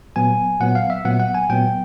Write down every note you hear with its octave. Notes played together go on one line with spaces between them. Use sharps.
A#2 F#3 B3 G#5
A#2 F#3 B3 F#5
F5
E5
A#2 F#3 B3 F#5
F#5
G#5
A#2 F#3 B3 G5